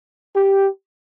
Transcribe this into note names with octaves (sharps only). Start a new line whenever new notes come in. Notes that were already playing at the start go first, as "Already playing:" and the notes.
G4